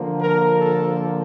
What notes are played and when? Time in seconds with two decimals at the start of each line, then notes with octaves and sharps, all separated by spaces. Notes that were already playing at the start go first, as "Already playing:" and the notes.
Already playing: D3 F3 A#3
0.21 A#4
0.59 A4